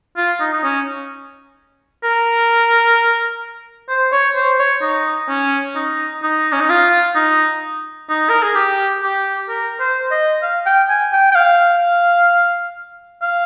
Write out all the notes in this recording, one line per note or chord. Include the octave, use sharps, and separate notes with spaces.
F4
D#4
D#4
C#4
A#4
C5
C#5
C5
C#5
D#4
C#4
D#4
D#4
C#4
D#4
F4
D#4
D#4
A#4
G#4
G4
G4
A#4
C5
D#5
F5
G5
G#5
G5
G5
F5
F5